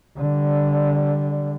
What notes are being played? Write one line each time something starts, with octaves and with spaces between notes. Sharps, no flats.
D3 G3